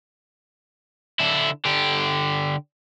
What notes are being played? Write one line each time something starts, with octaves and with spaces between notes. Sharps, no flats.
D3 E4
D3 G4